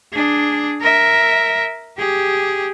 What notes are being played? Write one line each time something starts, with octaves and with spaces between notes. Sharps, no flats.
D4 G#4
A#4 E5
G4 G#4